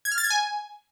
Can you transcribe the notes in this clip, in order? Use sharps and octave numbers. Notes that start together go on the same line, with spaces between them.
G#6
F6
A6
G#6
G#5